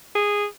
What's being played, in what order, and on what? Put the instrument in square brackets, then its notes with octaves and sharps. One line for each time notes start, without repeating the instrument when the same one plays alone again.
[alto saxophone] G#4